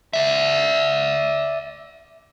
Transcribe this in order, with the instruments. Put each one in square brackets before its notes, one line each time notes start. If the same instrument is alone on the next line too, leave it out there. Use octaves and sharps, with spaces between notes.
[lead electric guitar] D5 E5